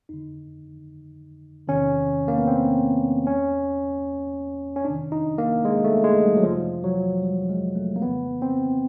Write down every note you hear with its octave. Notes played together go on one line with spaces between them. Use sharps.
F2 D3 D#4
E2 C3 D#3 C#4
A#3
B3
C4
E2 B2 C#4
C#4
F2 C3 D#3 D4
D#4
A#3
G#3
A3
G#3
G3
F#3
F2 C3 E3 F3
F#3
G3
G#3
A3
A#3
F2 C#3 E3 B3
C4